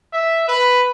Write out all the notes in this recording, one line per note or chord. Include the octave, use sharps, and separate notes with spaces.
E5
B4